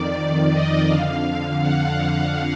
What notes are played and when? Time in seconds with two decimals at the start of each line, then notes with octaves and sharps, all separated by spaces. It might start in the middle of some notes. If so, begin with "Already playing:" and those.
Already playing: F2 D#3 D5
0.53 D#5
0.89 F2 D3 F5
1.62 F#5